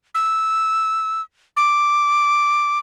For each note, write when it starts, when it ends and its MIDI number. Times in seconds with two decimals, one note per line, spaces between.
0.15 1.21 88
1.57 2.79 86